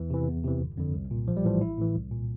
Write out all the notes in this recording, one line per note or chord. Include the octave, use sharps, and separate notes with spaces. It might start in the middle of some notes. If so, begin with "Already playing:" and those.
Already playing: E2 E3
C3 E3
E2
C3 E3
G1
F2 D3
C2
A#2
A#1 F3
G3
A2 E3 F3
A1 E4
A2 E3
C2
A#2